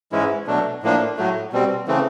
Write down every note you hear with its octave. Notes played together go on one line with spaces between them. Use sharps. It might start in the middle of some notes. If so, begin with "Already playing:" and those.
G#2 E3 G#3 C#4 E4
B2 F#3 A3 D4
A2 F3 A#3 D4
A2 F#3 A3
B2 G3 C4
C#3 E3 A3 C4